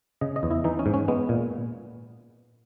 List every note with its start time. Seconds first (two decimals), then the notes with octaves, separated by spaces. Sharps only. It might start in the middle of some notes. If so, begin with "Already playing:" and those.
0.21 C#3 D#5
0.36 D#5
0.43 E2
0.51 E4
0.64 E3 D#4
0.79 C#4
0.86 G#2
0.94 C#4
1.08 G#3 B3
1.29 A#2